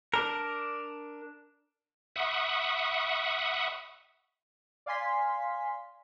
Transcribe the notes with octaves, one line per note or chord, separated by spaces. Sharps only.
D4 A#4
E5 F#5 B5 C#6 D#6
D5 F5 G#5 C6 B6